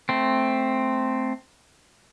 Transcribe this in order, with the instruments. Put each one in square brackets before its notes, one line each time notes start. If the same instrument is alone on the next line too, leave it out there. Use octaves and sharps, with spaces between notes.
[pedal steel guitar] A3 C4